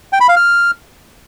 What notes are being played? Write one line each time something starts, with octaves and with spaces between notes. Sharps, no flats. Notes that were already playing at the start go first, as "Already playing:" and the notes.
G5
B5
F5
F6